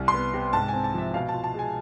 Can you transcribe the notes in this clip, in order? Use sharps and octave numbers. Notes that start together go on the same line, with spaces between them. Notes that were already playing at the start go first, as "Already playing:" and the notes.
Already playing: C2
C6
B3
C3
G#2 A5
C4 G#5
A5
F3 E5
B2 F5
A5
F4
A5
G#3 G#5